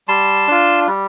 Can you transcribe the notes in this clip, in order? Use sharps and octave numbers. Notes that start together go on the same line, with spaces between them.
G3 A5 C6
D4 F4
G3